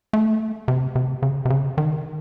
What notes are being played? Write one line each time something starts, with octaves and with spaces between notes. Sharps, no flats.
A3
C3
C3
C#3
C3
C#3
D#3